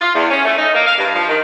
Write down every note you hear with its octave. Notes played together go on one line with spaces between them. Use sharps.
F4
E2
C#4
A3
D#4
A#3
F5
G2
F3
D#3